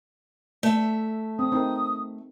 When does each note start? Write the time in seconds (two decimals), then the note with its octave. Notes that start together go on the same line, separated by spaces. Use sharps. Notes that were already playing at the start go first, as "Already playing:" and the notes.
0.63 A3 E5
1.39 C4 D#6
1.52 C4 D#4 A#4